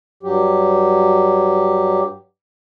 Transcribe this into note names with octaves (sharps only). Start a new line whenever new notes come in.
G2 F#3 G4